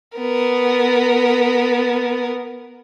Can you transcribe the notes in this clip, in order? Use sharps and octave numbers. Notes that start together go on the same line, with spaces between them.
B3 A#4